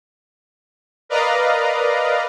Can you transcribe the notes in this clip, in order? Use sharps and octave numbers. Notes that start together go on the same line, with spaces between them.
A#4 B4 D5 D#5 F5 A#5